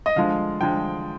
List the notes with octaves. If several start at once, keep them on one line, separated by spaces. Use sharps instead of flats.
D#5
D3 F3 G#3 F5
D3 F3 G#3 G5